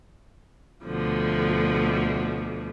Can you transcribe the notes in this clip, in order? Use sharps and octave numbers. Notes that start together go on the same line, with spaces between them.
D2 B2 D3 F3